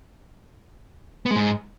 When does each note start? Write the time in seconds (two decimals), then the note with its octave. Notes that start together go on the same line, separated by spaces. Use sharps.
1.26 B3
1.31 G#3
1.36 G#2